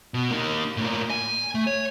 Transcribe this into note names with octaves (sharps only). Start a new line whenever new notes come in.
B2
A#3 D#4
A2 A#3
G#5
A3
C#5